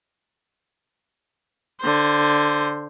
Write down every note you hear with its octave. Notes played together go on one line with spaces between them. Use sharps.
D3 C5